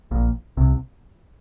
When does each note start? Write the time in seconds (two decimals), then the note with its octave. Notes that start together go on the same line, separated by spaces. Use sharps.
0.11 A#1 A#2
0.57 C2 C3